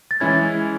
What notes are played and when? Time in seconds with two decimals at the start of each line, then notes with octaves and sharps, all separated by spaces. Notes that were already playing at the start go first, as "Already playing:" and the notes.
0.11 A6
0.20 E3 G#3 C#4 E4 G#6